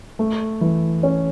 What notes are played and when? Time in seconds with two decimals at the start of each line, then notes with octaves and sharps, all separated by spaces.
0.19 A3
0.61 E3
1.03 C#4